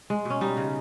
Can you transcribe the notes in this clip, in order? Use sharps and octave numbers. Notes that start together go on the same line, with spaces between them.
G#3
B2 C#4
G3 D#4
C#3